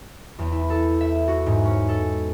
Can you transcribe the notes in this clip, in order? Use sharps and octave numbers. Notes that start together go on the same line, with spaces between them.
E2
E4
A4
E5
F#4
G#2
C#4
A4